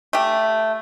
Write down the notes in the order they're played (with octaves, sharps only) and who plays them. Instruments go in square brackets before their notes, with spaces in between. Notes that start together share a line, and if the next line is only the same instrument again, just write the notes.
[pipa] A3 G4